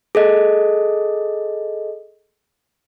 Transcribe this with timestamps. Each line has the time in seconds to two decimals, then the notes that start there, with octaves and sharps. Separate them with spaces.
0.15 G#4 A4 D#5